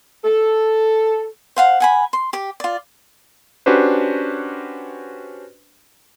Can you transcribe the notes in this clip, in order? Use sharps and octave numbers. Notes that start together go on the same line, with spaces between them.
A4
C5 F5 F#5
F#5 G#5 B5
C6
G4 D6
F4 D5
C#4 D4 F#4 G4 B4 C5